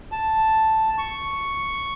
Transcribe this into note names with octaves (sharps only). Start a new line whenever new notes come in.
A5
C#6